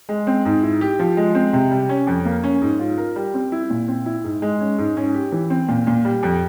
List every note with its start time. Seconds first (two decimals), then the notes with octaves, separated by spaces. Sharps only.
0.09 G#3
0.27 C4
0.45 G#2
0.62 E4
0.81 G4
0.99 F3
1.17 G#3
1.35 C4
1.53 C3
1.71 G3
1.89 C#4
2.07 F2
2.25 A#3
2.44 C#4
2.62 G#2
2.79 F4
2.98 A#4
3.16 G3
3.34 C4
3.52 E4
3.70 A#2
3.88 C4
4.06 E4
4.24 G#2
4.42 G#3
4.60 C#4
4.78 G#2
4.97 C#4
5.14 G4
5.32 E3
5.50 C4
5.68 A#2
5.87 A#2
6.05 G3
6.23 F2